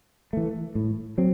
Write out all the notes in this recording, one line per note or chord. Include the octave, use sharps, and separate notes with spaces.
E3 A3
A2
F#3 C4